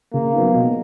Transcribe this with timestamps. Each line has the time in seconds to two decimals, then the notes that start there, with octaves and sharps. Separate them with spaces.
0.13 C#3 A#3
0.33 F#3 B3 D#4
0.54 B2